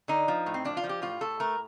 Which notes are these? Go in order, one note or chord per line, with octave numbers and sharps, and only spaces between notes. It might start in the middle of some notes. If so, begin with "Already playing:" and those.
D3 D#4
F3
A2
C4
F3 D4
F4
F3
G4
A2 F4
A2 A4
A3 A#4